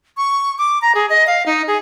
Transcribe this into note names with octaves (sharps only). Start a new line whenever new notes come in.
C#6
D6
A#5
G#4
D#5
F5
D#4
G#4